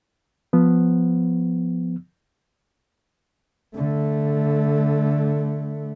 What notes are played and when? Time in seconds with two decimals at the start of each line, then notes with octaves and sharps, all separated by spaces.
0.53 F3 B3
3.75 D3 A3